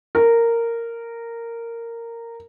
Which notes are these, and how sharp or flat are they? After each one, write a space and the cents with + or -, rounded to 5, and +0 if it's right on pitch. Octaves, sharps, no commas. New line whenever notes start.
A#4 -10